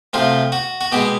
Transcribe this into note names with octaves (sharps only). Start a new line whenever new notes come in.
D2 C3 F3 F4
F#4
F#4
B2 G#3 B3 G4